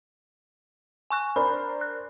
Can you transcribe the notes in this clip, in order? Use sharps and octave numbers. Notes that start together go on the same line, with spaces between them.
G#5 C#6 F#6
D4 A#4 C5 B5
F#6